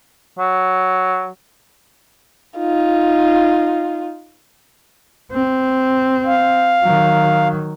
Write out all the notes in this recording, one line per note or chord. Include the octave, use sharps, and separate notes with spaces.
F#3
D#4 F4
C4
F5
D#3 F#3